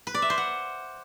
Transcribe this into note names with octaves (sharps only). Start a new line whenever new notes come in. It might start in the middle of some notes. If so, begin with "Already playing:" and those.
B4
D5
E5
C5
F#5